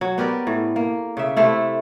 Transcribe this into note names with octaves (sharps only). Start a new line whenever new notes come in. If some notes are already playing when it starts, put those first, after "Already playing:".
F#3
B3 G4 A#4 D5
A2
A#3
C#3 E5
C3 A3 E4